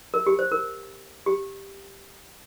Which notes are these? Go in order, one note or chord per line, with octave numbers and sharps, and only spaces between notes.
A#4
G4
C5
A#4
G4